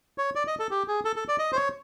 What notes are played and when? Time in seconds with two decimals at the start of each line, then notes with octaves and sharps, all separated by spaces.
0.18 C#5
0.35 D5
0.47 D#5
0.59 A4
0.71 G4
0.88 G#4
1.05 A4
1.16 A4
1.28 D5
1.39 D#5
1.52 C5
1.56 C#5